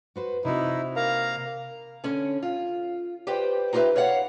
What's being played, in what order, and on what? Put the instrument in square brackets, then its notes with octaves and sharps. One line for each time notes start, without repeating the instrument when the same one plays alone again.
[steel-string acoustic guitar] F#4 B4 C5
[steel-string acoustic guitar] C3 F#4 [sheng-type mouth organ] D#4 E4
[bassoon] A#3 [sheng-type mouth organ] F5 A#5
[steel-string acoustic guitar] D3 C#4
F4
G4 B4 C5 D5 G5
D#4 F4 G4 G#4 B4 E5
C#5 D5 F5 F#5